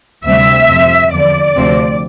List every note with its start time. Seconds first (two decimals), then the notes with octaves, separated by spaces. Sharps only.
0.25 D2 C3 G3 C4 E5
0.69 F2 C3 F3 C4
1.12 E2 D3 F3 D5
1.56 D2 C3 F3 C4